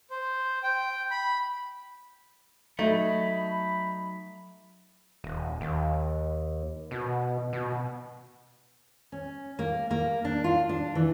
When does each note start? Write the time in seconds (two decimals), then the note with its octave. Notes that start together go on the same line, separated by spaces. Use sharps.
0.10 C5
0.63 G5
1.11 B5
2.79 F#3 A3 D#4 B5
5.24 D#1
5.61 D#2
6.91 B2
7.53 B2
9.12 C#4
9.59 A#3
9.91 A#3
10.25 D4
10.44 F4
10.69 D4
10.95 E3